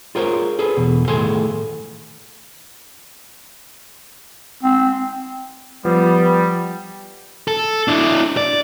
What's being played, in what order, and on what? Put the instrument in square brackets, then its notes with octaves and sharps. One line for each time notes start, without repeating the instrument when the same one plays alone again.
[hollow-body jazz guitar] F4 G#4 A#4 C5 C#5
G#4 A4 B4
E2 B2
A2 D#3 G#4 A4 G#5 C6
[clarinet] C4
[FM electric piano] F3 [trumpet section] G3 [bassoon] B3
[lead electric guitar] A4
D4 E4
D5